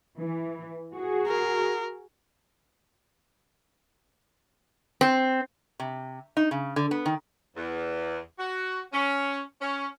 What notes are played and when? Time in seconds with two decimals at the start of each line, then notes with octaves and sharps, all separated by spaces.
0.18 E3
0.93 F#4 G#4
1.27 A#4
5.01 C4
5.80 C3
6.37 D#4
6.51 C#3
6.76 D3
6.91 B3
7.06 D#3
7.57 E2
8.38 F#4
8.92 C#4
9.61 C#4